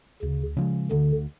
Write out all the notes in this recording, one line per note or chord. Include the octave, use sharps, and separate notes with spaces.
D2 C#3
C#3 F3 G#3
D2 D3